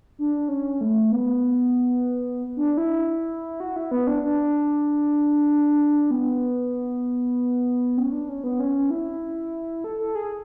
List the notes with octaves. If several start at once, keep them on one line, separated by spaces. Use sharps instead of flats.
D4
C#4
A3
B3
D4
E4
F#4
E4
B3
D4
D4
B3
C#4
D4
C#4
B3
C#4
E4
A4
A4
G#4